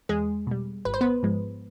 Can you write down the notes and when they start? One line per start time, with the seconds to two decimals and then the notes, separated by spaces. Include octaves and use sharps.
0.09 E2 G#3 G#4
0.47 B2 G3
0.85 G#1 B4
0.94 C5
1.01 B3 B4
1.23 G#2 F3 G#3